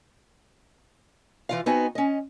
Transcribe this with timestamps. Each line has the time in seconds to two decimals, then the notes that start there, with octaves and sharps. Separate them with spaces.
1.49 E3 F4 F5
1.66 B3 C4 D#4 F#4 D#5 G#5
1.95 C#4 D#5